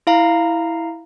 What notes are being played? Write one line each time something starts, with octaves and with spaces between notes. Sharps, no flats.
E4 F5 A#5